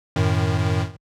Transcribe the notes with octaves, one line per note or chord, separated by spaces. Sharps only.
F#2 A2 D#3